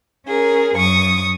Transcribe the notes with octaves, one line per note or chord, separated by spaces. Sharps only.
C#4 G#4 A#4
F#2 C#6 D#6